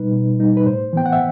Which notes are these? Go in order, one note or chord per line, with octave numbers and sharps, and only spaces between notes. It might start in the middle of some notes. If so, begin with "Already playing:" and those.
Already playing: B2 G3 D#4 B4
B2
G3 D#4
B4
A2 C5
E3 B3 G5
F#5
E5